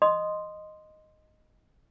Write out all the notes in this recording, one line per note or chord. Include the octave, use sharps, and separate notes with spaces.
D#5 C6 D#6